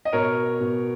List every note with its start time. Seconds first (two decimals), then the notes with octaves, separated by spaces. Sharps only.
0.05 D#5
0.13 B2 A#4 C#5
0.60 B2